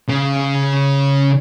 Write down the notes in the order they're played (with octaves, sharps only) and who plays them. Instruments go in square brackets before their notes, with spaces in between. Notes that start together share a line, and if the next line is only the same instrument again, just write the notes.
[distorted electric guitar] C#3